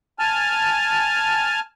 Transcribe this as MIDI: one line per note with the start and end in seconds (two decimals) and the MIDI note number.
0.19 1.60 80
0.19 1.60 81
0.19 1.60 89